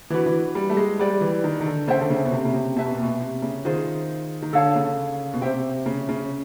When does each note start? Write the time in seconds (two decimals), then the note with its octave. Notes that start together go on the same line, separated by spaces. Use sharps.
0.10 E3 D4 F#4 B4
0.26 E3
0.55 G3
0.70 A3
0.77 G#3
0.99 G3 G4 B4 D5 G5
1.21 E3
1.44 D#3
1.61 D#3
1.66 D3
1.87 C#3 A4 C5 E5 G5
2.01 D3
2.10 C#3
2.25 B2
2.32 C3
2.45 C#3
2.54 C3
2.76 C3 B4 E5 A5
2.85 B2
2.95 A#2
3.03 B2
3.20 C3
3.42 C#3
3.65 D#3 F4 G#4 C5
4.42 D#3
4.53 D3 A4 C#5 F5 A5
4.75 C#3
5.33 B2
5.41 C3 G4 C5 E5 G5
5.86 C#3
6.09 C#3